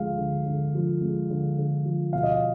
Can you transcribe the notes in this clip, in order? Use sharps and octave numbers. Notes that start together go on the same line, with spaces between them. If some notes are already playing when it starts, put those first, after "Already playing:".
Already playing: D3 F3 G#3 F5
D3
D3
F3
G#3
D3
D3
F3
B2 F5
D#5
F5